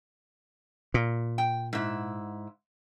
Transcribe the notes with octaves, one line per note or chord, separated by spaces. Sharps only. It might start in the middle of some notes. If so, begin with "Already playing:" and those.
A#2
G5
G#2 E4